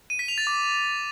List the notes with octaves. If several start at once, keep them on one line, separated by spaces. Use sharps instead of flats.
D#7
B6
F7
A6
D6